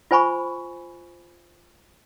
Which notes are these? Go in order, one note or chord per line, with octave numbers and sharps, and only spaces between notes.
F4 C5 G#5 B5 C#6